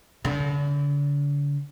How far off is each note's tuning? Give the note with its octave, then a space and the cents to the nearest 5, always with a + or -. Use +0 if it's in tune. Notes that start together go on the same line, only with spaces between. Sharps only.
D3 -40